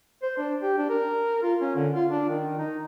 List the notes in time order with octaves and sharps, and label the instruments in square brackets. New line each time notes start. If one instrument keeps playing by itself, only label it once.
[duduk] C5
D4
G4
D4
A#4
F4
C#4
D3
F4
D4
D#3
D#4